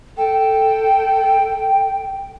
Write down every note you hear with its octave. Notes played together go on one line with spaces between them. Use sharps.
A4 G5